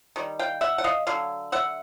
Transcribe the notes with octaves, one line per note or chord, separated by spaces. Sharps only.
D#3 G3
F5 G5
E5 F#5
F#5
D#5 F5
D3 F#3 F5
E5 F#5